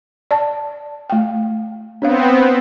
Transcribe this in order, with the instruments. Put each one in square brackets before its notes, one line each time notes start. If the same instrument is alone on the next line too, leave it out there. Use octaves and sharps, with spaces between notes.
[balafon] D5 A5
A3 G5
[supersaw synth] B3 C4 [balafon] D4 C#5 F5